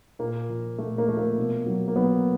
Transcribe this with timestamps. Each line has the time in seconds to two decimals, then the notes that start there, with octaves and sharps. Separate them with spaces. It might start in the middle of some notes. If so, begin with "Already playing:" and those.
0.19 A#2 A#3
0.50 F3
0.78 A#2 A3
0.98 A#3
1.08 F3 A3
1.17 A#3
1.37 B2
1.66 F#3
1.88 A#3
1.95 F#3 B3